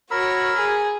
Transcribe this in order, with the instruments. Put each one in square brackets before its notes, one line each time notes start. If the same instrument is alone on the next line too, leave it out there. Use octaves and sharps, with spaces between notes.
[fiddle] F#4 C#5 [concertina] A#4 B5 E6
[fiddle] G#4